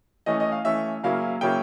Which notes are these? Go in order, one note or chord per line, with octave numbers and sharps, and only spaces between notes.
E3 A3 C#4 D#5
D#5
F5
E3 A3 C#4 E5
C#3 F#3 A#3 C#4 E4 F5
C#3 F#3 A#3 C#4 E4 G5